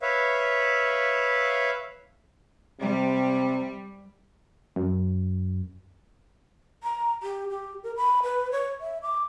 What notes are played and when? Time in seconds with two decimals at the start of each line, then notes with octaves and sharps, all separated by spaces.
0.02 B4 C#5 E5 F5
2.81 C3 G3
4.76 F#2
6.83 A#5
7.23 G4
7.50 G4
7.83 A#4
7.96 B5
8.23 B4
8.52 C#5
8.81 E5
9.03 D6